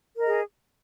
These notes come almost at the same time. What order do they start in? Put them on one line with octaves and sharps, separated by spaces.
A#4 D#5 G#4